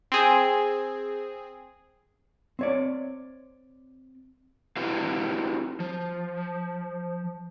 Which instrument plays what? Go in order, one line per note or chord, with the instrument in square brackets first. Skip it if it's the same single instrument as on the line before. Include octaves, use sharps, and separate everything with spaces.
[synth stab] C4 G#4
[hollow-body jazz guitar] C4 C#5 D5
[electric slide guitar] C4 E4 F#4 G4 B4 F5
F3